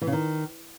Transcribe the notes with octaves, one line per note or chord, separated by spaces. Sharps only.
E3
C#3
D#3